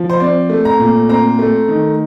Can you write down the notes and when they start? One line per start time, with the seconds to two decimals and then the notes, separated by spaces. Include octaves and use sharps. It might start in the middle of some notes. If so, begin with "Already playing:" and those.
Already playing: F3
0.10 C5
0.20 C4 D5
0.50 A3
0.65 A#5
0.79 A#2
1.09 C4 A#5
1.39 A3
1.68 D#3